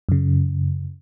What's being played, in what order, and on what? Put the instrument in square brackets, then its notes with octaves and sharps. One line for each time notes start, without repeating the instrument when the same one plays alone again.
[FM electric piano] F#2 C#3